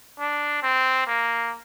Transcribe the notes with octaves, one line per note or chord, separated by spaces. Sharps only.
D4
C4
A#3